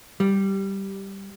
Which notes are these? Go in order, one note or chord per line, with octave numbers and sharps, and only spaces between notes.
G3